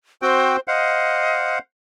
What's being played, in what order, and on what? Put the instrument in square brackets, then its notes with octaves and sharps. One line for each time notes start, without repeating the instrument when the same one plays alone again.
[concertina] C4 F#4 G5 [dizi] C5
[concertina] C5 F5 F#5 [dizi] D#5